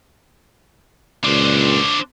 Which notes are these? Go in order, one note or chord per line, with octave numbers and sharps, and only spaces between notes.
C#2 A#2 D4 C5